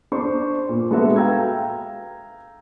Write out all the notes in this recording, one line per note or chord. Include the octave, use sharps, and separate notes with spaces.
D4 C5 C#6
A#2
G#3 B3 D4 F#4 A4 E5
F5 G5 A#5 E6 G#6